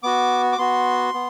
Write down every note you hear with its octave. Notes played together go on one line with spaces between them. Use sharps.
B3 F#4 D6
D6
B3 F#4 C6
B3